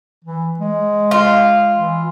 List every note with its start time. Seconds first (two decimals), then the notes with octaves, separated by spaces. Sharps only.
0.24 E3
0.59 G#3
1.11 F4
1.76 E3